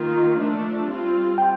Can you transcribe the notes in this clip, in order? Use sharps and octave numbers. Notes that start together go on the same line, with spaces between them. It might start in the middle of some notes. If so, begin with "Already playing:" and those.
Already playing: D#3 A#3 F4
F3 A3 D4
G3 C4 F4
G5